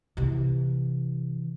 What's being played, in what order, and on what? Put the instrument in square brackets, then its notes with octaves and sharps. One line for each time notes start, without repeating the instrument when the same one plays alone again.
[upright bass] C3 E3